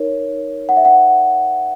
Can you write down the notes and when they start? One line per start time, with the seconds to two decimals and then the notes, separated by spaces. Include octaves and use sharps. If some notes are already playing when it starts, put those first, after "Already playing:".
Already playing: D#4 A#4 C#5
0.69 F#5
0.77 E5
0.85 F#5